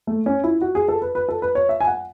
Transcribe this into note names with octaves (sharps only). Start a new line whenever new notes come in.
A3
C#4
E4
F#4
G#4
A4
B4
B4
A4
B4
C#5
E5
G#5
F#5